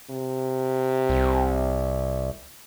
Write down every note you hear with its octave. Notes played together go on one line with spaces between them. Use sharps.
C3
C2